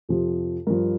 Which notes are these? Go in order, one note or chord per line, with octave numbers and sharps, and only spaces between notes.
F2 C3 F3
G2 F3 A#4